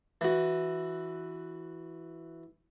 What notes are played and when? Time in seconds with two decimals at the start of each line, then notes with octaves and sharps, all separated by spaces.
0.21 E3 F#4